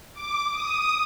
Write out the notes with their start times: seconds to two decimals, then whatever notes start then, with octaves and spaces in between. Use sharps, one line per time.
0.14 D6
0.51 D#6